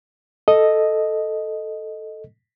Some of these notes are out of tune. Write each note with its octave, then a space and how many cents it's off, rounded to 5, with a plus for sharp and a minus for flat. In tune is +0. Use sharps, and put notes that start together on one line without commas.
A4 +0 D#5 +0